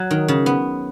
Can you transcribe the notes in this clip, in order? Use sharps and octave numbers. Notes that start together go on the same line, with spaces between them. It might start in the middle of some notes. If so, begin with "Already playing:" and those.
Already playing: F#3
D#3
C#3
B3